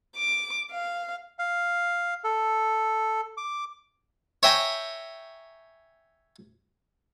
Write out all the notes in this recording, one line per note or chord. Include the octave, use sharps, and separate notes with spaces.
D6
F5
F5
A4
D6
C#5 E5 G5 G#5 A#5